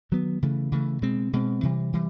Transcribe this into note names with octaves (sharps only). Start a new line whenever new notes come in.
D#3 F#3 B3
C#3 E3 A3
C#3 E3 A3
B2 G#3 C4
B2 G#3 C4
C3 E3 G3
C3 E3 G3